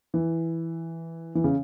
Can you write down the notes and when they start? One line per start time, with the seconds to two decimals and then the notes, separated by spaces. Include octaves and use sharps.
0.14 E3
1.35 E3
1.44 C#3